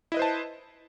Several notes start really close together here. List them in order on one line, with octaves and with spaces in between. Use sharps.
E4 D#5 B4 C5 A5